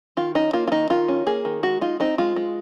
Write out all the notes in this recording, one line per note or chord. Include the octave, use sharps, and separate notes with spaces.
D#3 F4
C#4 D#4
A#3 F4
F4
D#3 D#4
D#3 F4
C#4
A#3 G#4
D#3
G#3 F#4
D#4 F4
C4 D#4
G#3 F4
G#3